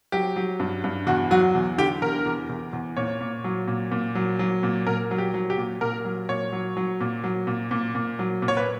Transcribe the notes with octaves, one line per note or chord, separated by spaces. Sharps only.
F#3 G4
F#3
G2
G2
E2 F#4
F#3 F#4
E2
D3 G4
E2 A#4
E2
E2
E2
A#2 C#5
A#2
F#3
A#2
A#2
F#3
F#3
A#2
A#2 A#4
F#3
G4
F#3
G4
A#2
A#2 A#4
F#3
A#2 C#5
F#3
F#3
A#2
F#3
A#2
A#2
A#2
F#3
A#2
C#5
B4